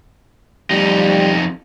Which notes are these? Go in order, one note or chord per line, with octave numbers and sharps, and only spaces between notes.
F2 G3 D#4